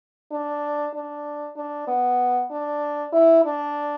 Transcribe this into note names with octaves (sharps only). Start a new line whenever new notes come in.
D4
D4
D4
B3
D4
E4
D4